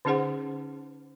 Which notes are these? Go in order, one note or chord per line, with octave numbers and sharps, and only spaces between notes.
D3 C#4 D#4 G#4 C5 F#5